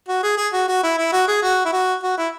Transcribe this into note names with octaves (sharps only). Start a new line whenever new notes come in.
F#4
G#4
G#4
F#4
F#4
E4
E4
F#4
G#4
F#4
E4
F#4
F#4
E4